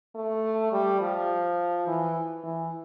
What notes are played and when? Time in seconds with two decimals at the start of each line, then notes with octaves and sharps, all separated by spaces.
0.15 A3
0.72 G3
1.00 F3
1.87 E3
2.43 E3